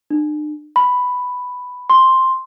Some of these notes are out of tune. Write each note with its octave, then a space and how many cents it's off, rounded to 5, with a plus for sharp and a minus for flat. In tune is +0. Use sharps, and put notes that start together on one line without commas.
D4 +45
B5 +5
C6 +5